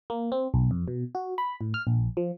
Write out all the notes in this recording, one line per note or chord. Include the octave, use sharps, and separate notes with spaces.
A#3
C4
B1
F2
B2
F#4
B5
A2
F6
A#1
F3